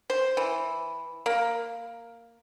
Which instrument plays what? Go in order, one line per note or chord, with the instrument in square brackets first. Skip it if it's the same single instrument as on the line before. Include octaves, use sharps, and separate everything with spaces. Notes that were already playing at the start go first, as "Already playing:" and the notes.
[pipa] C5
E3
A#3